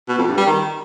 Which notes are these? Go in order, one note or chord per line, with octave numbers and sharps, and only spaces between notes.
B2
F2
G2
G3
D#3